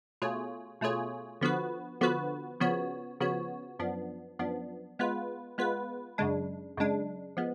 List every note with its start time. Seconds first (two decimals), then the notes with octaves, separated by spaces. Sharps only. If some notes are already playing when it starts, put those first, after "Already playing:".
0.22 B2 A3 F4 G#4 C#5
0.81 B2 A3 F4 G#4 C#5
1.41 D3 F3 B3 F#4 B4
2.01 D3 F3 B3 F#4 B4
2.60 C#3 F3 B3 F#4 C#5
3.20 C#3 F3 B3 F#4 C#5
3.79 F#2 F3 B3 D4
4.39 F#2 F3 B3 D4
4.99 G#3 B3 F4 B4
5.58 G#3 B3 F4 B4
6.18 F#2 C#3 G#3 D4
6.77 F#2 C#3 G#3 D4
7.37 F3 G#3 B3